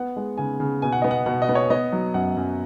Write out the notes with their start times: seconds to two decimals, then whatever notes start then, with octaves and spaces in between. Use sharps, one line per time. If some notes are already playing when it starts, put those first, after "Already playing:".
Already playing: B3 F#5
0.16 G#3
0.38 C#3 G#5
0.60 C#3
0.82 B2 G#5
0.92 F#5
1.02 B3 D#5
1.11 F#5
1.26 B2 F#5
1.42 D#5
1.49 B3
1.55 C#5
1.70 B3 D#5
1.92 F#3
2.14 F#2 F#5
2.37 F#2